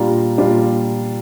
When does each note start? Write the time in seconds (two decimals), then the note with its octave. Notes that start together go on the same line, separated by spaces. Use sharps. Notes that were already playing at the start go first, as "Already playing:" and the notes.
Already playing: A#2 G3 D4 F4 A#5
0.38 A#2 G3 D4 F4